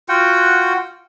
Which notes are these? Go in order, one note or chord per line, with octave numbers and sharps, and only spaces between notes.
F4 F#4 F#5 G5